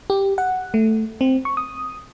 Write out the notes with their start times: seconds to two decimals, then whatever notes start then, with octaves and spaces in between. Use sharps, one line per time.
0.10 G4
0.38 F#5
0.74 A3
1.21 C4
1.45 C#6
1.57 D#6